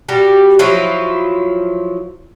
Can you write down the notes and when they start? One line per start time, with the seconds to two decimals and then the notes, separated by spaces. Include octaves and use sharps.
0.09 G3 F#4 G4
0.59 F3 F#3 E4 F4